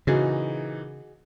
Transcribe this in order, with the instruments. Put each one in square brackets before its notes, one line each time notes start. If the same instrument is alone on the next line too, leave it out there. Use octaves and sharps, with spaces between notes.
[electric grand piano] A#2 E3 D#4 [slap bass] C#3 [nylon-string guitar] F#4 G#4 D#5